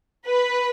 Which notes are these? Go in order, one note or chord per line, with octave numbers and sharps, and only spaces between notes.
B4